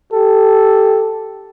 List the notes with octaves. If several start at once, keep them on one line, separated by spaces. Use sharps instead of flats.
G4 A4